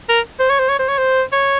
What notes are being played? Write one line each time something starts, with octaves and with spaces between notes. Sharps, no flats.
A#4
C5
C#5
C5
C#5
C5
C#5
C5
C#5